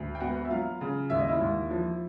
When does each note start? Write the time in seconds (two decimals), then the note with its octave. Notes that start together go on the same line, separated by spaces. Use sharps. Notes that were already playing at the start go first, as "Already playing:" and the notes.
Already playing: D2
0.15 G5
0.20 B3 F#4 F#5
0.45 E5
0.50 F#3 F4 F5
0.81 C#3
1.10 D#2 E5
1.20 D#5
1.28 E4 E5
1.41 D#2
1.71 F3